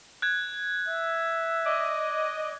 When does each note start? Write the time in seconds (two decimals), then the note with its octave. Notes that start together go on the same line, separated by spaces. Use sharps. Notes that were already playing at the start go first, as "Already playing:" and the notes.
0.22 F#6 G#6
0.88 E5
1.66 D5 D#5